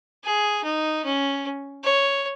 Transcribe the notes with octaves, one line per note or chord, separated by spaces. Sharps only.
G#4
D#4
C#4
C#5